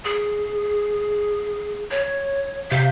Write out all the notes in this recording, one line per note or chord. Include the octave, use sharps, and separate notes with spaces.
G#4
C#5
C3 F5 G6 B6